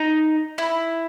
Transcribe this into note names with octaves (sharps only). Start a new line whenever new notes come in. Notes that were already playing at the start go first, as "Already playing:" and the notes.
Already playing: D#4
E4